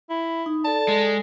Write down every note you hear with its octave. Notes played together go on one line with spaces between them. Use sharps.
E4
D#4
A4 D5 A5
G#3